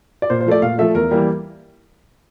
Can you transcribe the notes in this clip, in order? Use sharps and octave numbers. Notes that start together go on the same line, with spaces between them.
D5
A#2 C5
C5
F3 A3 D5
A#2 F5
F3 A3 E5
E2 A#4
E3 G3 A#3